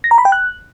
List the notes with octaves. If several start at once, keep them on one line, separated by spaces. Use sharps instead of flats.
A#6
A#5
B5
G5
F#6